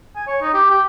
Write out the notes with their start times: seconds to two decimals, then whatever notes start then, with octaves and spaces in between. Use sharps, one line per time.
0.16 G#5
0.27 C#5
0.42 D#4
0.54 G4
0.71 G4